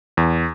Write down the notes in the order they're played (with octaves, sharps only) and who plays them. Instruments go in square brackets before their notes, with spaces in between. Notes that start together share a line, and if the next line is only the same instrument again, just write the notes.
[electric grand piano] E2